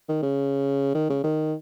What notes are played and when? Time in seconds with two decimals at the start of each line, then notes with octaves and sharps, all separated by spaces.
0.09 D#3
0.23 C#3
0.95 D#3
1.10 C#3
1.24 D#3